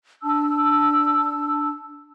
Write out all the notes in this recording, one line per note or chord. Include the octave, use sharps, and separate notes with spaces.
D4 A5 E6